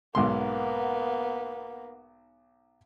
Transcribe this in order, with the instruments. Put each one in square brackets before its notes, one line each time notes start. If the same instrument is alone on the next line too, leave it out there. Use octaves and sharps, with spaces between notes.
[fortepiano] B1 G#2 C6 [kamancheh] A#3 B3